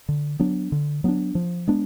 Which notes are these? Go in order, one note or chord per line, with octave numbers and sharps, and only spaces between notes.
D3
F#3 B3 D4
D3
F#3 B3 D4
F3
G#3 B3 D4